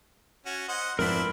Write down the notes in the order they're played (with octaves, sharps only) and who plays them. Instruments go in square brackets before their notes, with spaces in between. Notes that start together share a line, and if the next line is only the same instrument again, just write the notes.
[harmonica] C#4 F#4
C5 D#5 F#5
[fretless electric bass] F2 G#2 [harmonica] C4 D4 E4 [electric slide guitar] A#4 B4